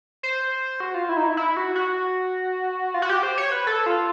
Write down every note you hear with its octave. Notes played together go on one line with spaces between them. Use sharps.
C5
F#4
F4
E4
D#4
E4
E4
F#4
F#4
F4
F#4
G4
C5
C#5
B4
A4
F4